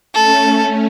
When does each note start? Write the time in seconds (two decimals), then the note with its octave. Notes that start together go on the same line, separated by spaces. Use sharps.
0.15 A3 C#4 A4